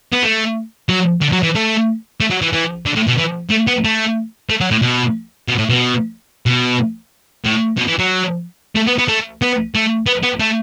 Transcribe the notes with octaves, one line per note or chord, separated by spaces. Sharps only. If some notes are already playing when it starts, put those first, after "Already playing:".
B3
A3
F#3
D3
F#3
E3
A3
A3
F#3
E3
E3
D3
A2
B2
E3
A3
B3
A3
A3
F#3
A2
B2
B2
A2
B2
B2
A2
B2
E3
F#3
A3
B3
B3
A3
B3
A3
B3
B3
A3